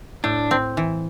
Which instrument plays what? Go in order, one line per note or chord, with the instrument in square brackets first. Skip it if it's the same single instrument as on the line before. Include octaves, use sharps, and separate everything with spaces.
[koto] A2 [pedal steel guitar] D4
[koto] C4
E3